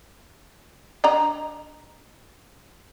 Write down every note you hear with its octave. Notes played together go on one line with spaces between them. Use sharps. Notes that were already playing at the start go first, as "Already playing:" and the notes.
D4 D#5 A#5